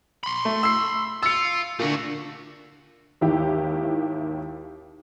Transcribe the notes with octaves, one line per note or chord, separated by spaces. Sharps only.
B5 C6
A3
E6 C7
F4 E6 C#7
A#2 D3 A3 F#4
G#1 D#2 E4 G4